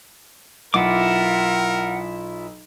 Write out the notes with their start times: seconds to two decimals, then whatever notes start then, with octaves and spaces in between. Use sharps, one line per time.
0.74 B1 E4 F4 A#4 F#5 D6